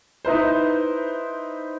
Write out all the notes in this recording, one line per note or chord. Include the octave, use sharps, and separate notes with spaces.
D#4 E4 B4 C5